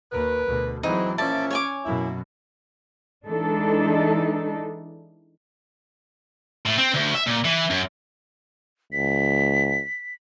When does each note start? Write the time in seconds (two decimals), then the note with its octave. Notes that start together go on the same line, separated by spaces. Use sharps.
0.12 D#2 A#4 B4
0.46 D2 B2
0.83 G#2 E3 F#3 C4 D#4
1.18 A#2 F3 C#4 D5 E5 A5
1.51 C#5 G#5 D6
1.85 F#2 B2 A#3 E4
3.26 E3 G#3 D4 D#4 A4
6.66 A2
6.78 C4
6.95 D2
7.15 E5
7.27 A#2
7.45 E3
7.70 F#2
8.92 C#2 B6